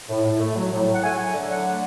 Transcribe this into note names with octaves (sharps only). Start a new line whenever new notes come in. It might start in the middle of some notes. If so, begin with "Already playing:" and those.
A2
A2
A3
F#3
A2
A2
F#5
A3 G#5
F#3
D3
D3 F#5
A3